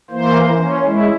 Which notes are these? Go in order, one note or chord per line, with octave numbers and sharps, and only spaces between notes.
E3 A#3 C5
C#4
G#3 E4